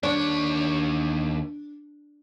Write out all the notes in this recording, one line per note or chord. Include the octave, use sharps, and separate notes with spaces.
D#2 D4 C#5